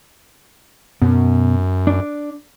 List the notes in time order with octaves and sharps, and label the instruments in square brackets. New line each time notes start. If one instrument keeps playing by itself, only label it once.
[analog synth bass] F#2 [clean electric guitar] B2
[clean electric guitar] D4 D5